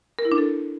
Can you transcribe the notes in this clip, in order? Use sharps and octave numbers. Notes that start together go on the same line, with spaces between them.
A#4
E4
D4
A4